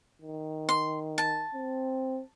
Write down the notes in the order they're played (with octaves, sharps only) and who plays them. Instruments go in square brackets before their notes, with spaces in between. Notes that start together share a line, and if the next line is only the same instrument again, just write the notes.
[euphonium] D#3
[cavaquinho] C6
A5
[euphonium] C4